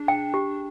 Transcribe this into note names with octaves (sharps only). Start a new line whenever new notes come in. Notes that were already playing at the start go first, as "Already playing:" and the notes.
Already playing: D4 G#4
G5
G4